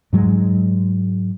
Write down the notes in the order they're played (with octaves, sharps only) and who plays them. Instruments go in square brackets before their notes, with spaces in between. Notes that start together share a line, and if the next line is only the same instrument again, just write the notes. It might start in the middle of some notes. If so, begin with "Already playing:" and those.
[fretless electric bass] G#2 F#3 G#3